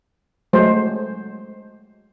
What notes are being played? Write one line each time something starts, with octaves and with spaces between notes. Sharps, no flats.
F#3 G#3 A3 C5